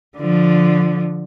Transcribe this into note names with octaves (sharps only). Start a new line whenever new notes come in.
D3 F3